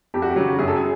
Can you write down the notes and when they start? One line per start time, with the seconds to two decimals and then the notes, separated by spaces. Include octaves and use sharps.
0.14 F2 G4
0.22 F#4
0.30 G4
0.36 C#3 F#3
0.59 F#2 G#4
0.68 A4
0.76 G#4